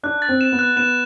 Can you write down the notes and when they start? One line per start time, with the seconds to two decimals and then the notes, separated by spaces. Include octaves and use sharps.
0.03 D4 F#6
0.22 A6
0.29 C4
0.41 E7
0.52 B3
0.59 F#6
0.76 B3 E7